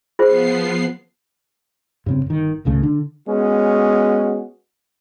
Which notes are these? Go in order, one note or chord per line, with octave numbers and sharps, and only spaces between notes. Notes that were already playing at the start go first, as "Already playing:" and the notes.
F3 B3 F4 G#4 C5 C7
G2 C#3 C4
G1 D#3
G#1 C#2 C#3 A3
D3 D4
G#3 B3 C#4 F#4